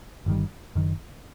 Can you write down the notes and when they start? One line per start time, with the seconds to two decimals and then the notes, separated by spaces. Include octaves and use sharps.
0.26 G1 G2 D#3 G3
0.75 F#1 F#2 D#3